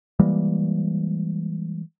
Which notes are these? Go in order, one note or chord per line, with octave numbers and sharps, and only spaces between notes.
E3 G3 G#3 A#3